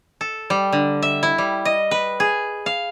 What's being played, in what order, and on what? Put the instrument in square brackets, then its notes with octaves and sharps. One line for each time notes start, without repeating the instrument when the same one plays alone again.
[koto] A4
G3
D3
E5
E4
G3
D#5
B4
G#4
F5